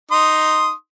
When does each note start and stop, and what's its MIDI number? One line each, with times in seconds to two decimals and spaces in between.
0.12 0.72 63
0.12 0.72 84
0.12 0.72 87